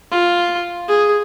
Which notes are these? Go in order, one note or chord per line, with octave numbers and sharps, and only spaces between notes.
F4
G#4